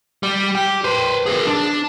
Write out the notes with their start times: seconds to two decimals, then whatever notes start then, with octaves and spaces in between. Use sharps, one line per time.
0.23 G3
0.55 G4
0.84 B4 C5
1.26 G#4 A#4
1.47 D4